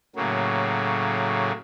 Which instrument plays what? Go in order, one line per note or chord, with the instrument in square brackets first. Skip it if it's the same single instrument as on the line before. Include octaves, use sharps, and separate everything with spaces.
[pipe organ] A2 C#3 F#3 A#3